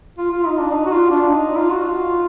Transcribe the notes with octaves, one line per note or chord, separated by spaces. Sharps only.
F4
F4
D#4
D4
D#4
F#4
F4
D4
D#4
F4
F#4
F4